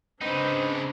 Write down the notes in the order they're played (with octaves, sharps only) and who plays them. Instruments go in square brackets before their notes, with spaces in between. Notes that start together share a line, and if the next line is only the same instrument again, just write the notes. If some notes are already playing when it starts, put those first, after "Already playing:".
[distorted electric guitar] C#3 D#4 [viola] C4 D4 [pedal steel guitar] B4 D#5 G5